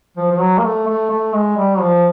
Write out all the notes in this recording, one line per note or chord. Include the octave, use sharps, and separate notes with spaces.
F3
F3
F#3
A#3
A3
A3
A3
G#3
G3
F3